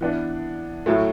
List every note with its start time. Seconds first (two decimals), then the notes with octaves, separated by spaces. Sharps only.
0.01 E3 B3 D4
0.86 A2 F#3 A3